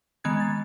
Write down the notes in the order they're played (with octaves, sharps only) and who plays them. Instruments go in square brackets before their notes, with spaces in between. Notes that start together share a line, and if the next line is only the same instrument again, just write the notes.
[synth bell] D#3 G#3 B3 G#6
A6